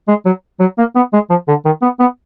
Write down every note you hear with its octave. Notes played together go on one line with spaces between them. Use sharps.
G#3
F#3
F#3
A#3
B3
G#3
F3
D3
D#3
B3
B3